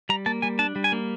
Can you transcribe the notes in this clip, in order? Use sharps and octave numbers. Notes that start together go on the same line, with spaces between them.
G3 A#5
A#3 A5
G3 G#5
D4 A5
G3
G#5
A#3